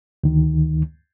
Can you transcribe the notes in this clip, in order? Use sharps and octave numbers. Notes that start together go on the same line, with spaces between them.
D2 D#3